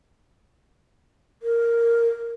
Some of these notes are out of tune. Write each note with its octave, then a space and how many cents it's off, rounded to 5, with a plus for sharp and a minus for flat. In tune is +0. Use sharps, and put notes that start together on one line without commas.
A#4 -5